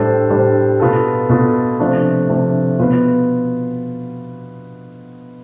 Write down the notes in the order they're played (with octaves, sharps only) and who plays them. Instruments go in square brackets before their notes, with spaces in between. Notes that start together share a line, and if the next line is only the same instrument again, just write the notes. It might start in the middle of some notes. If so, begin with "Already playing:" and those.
Already playing: [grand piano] A2 G3 D4 A4 C5
A2 G3 D4 A4 C5
B2 B3 F4 A4
B2 B3 F4 A4
C3 F3 A3 D4
C3 F3 A3 D4
B2 B3 F4 B4